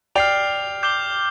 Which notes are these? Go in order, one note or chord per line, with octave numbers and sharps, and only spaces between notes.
D5 G5 F6 C7 F7
D6 G6 C7 G7